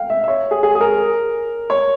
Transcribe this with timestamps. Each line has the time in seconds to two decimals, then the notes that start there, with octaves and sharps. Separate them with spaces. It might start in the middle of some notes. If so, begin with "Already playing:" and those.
Already playing: F5 G5
0.10 E5
0.24 E5
0.28 C#5
0.51 G#4
0.63 G#4
0.75 G#4
0.81 A#4
1.70 C#5